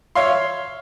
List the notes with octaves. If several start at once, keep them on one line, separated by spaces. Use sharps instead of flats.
C#5 E5 F5 C6